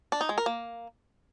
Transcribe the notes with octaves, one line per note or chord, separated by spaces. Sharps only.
D4
D#4
G#3
A#4
A#3